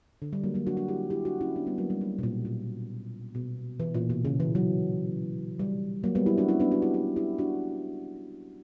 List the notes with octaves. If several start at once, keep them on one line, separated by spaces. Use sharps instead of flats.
D3
G3
F#3 A#3
F#3 A#3
D4 F#4
D4 F#4
E4 G4
E4 G4
D4 F#4
C#4 E4
B3 D4
G3 B3
F#3 A#3
G3
G3
B2
A#2
A#2
B2
E3
A#2
B2
C#3
E3
F#3
G3
F#3 A#3
G3 B3
E4 G4
D4 F#4
C#4 E4
B3 D4
D4 F#4
E4 G4
E4 G4
E4 G4
D4 F#4